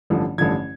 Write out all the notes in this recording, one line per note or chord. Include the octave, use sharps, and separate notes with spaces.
A1 G2 D3 F3
A1 G2 D3 F3 G#6